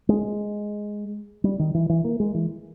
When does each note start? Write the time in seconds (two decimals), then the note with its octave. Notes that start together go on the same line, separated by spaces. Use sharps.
0.09 G#3
1.44 G3
1.59 D#3
1.74 E3
1.89 E3
2.04 A#3
2.20 G#3
2.34 E3